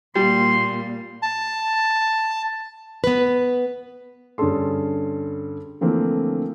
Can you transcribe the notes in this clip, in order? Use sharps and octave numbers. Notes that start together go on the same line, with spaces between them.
A#2 G3 C6
A5
B3 B4
G2 D3 C#4 G#4 A4 C6
D3 E3 F3 A3 A#3 C4